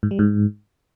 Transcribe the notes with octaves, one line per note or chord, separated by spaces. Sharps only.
G#2
G3
G#2